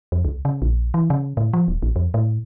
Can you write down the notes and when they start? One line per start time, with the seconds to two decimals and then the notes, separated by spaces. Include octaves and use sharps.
0.12 F2
0.25 C#2
0.45 C#3
0.62 A#1
0.94 E3
1.10 C#3
1.37 A2
1.53 F3
1.68 D#1
1.83 A1
1.96 F2
2.14 A2